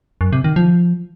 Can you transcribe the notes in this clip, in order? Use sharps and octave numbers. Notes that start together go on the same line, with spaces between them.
F#2
C3
D#3
F3